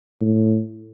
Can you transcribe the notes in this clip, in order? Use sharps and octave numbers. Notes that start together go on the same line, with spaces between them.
A2